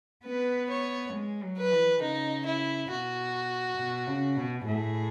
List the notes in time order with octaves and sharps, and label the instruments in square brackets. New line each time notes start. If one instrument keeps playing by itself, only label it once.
[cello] B3 [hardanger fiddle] B4
[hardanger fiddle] C#5
[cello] G#3
F#3
[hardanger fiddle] B4
[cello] E3
[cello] C#3 [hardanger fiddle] D#4
[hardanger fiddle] E4
[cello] B2 [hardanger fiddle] F#4
[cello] B2
C#3
B2
[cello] A2 [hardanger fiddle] G#4